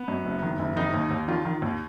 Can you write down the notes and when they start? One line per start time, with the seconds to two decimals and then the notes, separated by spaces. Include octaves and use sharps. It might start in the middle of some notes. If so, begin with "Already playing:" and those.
Already playing: B3
0.08 F#2
0.25 F#1
0.42 D#3
0.59 F#1
0.76 D#3 D#4
0.94 D#2
1.11 D#2
1.28 D#3 F4
1.45 D#3
1.62 D#2